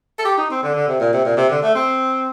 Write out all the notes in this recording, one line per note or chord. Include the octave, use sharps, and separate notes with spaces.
A4
G4
D#4
C4
D3
D3
C3
A#2
C3
A#2
C3
D3
A3
C4